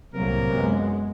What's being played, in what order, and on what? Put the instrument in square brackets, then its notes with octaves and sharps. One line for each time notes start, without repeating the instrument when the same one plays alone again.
[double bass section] C2 A2 [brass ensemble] C3 A#3 A#4 [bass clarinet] F#3
[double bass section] F#2 G#3 B3